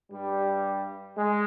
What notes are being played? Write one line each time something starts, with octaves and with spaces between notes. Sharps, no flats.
G2 G3
G#3